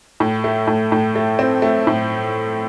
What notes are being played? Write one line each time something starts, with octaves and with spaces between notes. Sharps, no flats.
A2
A3
A2
A2
A3
C4
A3
A2